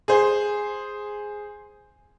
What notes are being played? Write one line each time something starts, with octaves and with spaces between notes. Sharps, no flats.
G#4 C5